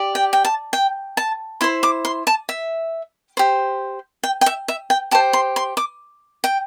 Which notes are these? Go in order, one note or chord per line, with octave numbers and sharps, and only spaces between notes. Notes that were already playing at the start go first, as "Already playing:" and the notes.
Already playing: G4 D5
G5
G5
A5
G5
A5
E4 C5 C6
D6
C6
A5
E5
G4 C5
G5
G5
E5
E5
G5
G4 C5 A5
C6
C6
D6
G5